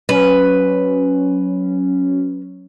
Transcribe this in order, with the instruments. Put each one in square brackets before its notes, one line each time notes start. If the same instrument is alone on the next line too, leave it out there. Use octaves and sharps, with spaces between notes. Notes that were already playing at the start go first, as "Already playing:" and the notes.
[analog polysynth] F#3 C#4 [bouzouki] B4